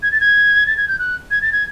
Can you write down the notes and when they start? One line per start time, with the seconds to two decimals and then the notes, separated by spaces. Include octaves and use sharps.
0.03 G#6
0.12 A6
0.21 G#6
0.67 A6
0.77 G#6
0.88 G6
0.99 F#6
1.31 G#6
1.42 A6
1.52 G#6